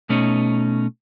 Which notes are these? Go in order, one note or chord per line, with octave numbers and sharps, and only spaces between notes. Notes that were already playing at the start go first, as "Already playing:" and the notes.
B2 A3 C#4 D#4